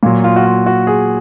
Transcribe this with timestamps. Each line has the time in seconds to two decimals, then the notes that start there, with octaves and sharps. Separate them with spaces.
0.03 A#2 F#3 F4
0.24 F4
0.36 F#4
0.46 F4
0.66 F#4
0.87 G#4